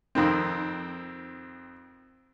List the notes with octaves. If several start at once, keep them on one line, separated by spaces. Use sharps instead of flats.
F2 D#3 C4